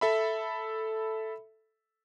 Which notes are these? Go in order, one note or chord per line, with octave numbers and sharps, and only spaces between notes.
A4 E5 B5